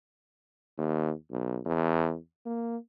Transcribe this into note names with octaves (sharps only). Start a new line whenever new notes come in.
D#2
B1
E2
A#3